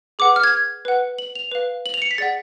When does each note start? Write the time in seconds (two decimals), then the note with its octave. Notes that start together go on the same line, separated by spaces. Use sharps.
0.19 G#4 B4 F#5 D6
0.36 F6
0.44 G#6
0.85 B4 F#5
1.18 F#7
1.35 F7
1.51 B4 F5
1.86 F#7
1.94 F7
2.02 C#7
2.11 B6
2.18 G#4 D5 F#5 A6